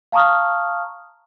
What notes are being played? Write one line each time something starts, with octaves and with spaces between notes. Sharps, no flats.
F5 A5 A#5 C#6 D#6 F6